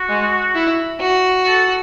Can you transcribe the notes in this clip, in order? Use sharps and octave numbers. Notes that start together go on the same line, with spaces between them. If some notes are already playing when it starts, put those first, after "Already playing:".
Already playing: F#4
G#3
E4
F#4
A4